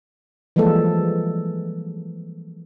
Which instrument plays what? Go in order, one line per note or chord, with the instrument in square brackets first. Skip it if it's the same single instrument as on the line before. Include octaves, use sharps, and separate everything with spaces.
[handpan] E3 F3 G3 G#3 A#3 A4